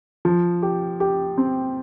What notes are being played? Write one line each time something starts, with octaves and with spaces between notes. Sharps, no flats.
F3
G4
G4
C4